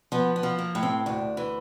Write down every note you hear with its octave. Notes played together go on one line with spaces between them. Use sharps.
F3 B3
B3
F3
A#3
A2
C4
D2 D4
E3